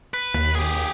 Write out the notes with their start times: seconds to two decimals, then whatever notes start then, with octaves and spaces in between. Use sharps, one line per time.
0.14 B4
0.34 D#2
0.56 G4 G#4